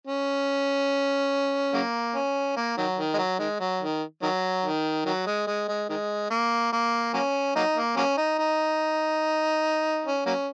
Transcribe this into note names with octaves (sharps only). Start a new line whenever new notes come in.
C#4
C#3 F#3 A#3
C#4
A#3
D#3 F#3
D#3
G#3
F#3
D#3 G#3
F#3
D#3
D#3 F#3
D#3
D#3 F#3
G#3
G#3
G#3
D#3 G#3
A#3
A#3
F#3 A#3 C#4
F#3 A#3 D#4
A#3
F#3 A#3 C#4
D#4
D#4
C#4
F#3 A#3 C#4